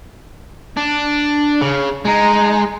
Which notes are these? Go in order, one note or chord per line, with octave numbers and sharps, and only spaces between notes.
D4
C#3
G#3 D#4